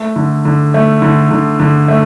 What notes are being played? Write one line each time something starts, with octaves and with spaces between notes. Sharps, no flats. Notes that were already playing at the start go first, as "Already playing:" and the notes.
Already playing: A3
D3
D3
A3
D3
D3
D3
A3